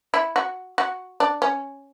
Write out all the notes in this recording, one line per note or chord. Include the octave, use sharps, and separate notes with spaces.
E4
F#4
F#4
D4
C#4